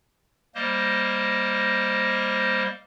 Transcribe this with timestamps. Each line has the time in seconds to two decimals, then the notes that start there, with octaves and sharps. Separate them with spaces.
0.55 G3 A#3 C5 D#5